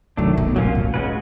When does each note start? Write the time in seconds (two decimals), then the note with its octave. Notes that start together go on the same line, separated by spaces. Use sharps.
0.17 C3 D#3 F#3 A3 D4
0.37 B2
0.56 A2 F#3 A#3 C#4 F4
0.75 A2
0.94 G#3 C#4 F#4 B4